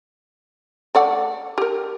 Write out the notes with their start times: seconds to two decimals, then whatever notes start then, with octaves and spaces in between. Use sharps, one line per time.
0.95 A3 D5 F#5
1.58 G4 A#4